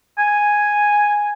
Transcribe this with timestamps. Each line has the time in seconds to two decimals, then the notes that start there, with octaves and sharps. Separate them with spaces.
0.18 G#5